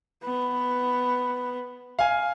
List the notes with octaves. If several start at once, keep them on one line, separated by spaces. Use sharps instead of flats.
B3
F5 G#5